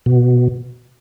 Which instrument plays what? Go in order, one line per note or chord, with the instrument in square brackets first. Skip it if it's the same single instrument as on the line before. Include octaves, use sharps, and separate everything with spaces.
[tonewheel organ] B2